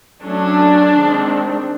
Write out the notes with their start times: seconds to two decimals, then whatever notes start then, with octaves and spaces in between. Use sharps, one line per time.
0.23 F#3 A3 C#4 D4
0.93 D#3 G#3 C4